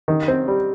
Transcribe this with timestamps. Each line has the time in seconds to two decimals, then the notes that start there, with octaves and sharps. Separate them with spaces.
0.08 D#3
0.28 C4
0.48 G3